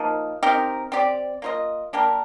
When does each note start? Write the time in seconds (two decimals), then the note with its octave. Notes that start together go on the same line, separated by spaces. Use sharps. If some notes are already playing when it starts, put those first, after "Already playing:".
Already playing: F3 A#3 D#4
0.43 C4 D#4 G4 A#4
0.92 C4 G4 D5
1.42 A#3 F4 C5 D#5
1.93 A#3 D4 G4 A#4